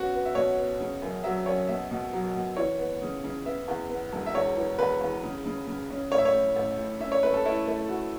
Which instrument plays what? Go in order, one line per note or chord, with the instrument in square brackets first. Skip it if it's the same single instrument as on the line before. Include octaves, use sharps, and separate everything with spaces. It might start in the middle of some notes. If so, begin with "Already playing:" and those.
Already playing: [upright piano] B3 C#4 [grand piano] F#4
[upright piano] B3
[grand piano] E5
[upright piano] B2 [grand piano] C#5
[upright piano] B3
C#3
F#2
[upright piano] F#3 [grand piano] E5
[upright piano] F#2 [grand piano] C#5
[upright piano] B2 [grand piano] E5
[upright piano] B2
F#3
B2
[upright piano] E3 [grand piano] C#5
[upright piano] B3
C#3
C#3
[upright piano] B3 [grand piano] E5
[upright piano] E2
B3
E1
[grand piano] E5
[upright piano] E2 [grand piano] C#5
[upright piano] E3
[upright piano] E2 [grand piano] B4
[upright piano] E2
C#3
C#3
C#3
C#4
[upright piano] A1 [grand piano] C#5
[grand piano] E5
C#5
[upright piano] A2
A1
A2
[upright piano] C#4 [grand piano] E5
[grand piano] C#5
[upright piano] A3 [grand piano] B4
[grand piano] A4
[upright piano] A3 [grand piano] E4
[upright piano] A3
F#4